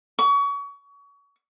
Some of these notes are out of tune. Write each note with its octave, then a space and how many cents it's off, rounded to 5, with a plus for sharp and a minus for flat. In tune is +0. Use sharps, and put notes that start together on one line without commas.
C#6 +30